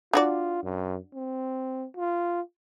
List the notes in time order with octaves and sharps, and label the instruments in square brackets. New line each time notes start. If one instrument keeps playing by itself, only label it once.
[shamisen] D4 F#4 D5 [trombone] F4
[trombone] F#2
C4
F4